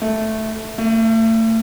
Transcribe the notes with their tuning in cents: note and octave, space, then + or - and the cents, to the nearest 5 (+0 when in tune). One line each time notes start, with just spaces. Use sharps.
A3 -5
A3 +35